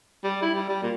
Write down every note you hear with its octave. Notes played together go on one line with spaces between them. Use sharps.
G3
E4
G3
G3
A#2